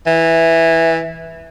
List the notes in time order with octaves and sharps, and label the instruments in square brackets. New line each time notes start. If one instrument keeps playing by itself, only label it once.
[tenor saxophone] E3